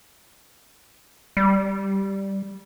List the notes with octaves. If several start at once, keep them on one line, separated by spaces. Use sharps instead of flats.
G3